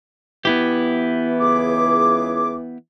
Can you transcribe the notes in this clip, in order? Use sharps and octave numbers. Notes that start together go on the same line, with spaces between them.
E3 B3 E4 G4
C#2 G#4 D6